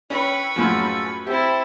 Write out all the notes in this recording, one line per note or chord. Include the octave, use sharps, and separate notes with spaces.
C#4 E4 B4 G5 C#6
F#2 A2 F3 F4 G#4 A4
C4 E4 G4 A4 E5